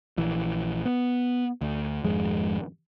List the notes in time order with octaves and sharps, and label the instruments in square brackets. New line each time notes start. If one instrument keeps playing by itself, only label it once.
[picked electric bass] A#1 E3
B3
D2
G#1 F2 G#3